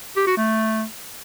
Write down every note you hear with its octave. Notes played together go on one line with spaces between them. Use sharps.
G4
F#4
A3